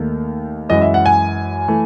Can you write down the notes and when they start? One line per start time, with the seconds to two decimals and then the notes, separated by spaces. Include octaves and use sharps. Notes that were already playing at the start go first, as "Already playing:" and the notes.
Already playing: D#2 D#3 A3
0.69 F#2 E3 G#3 D#5
0.82 E5
0.94 F#5
1.06 G#5
1.68 E3 A3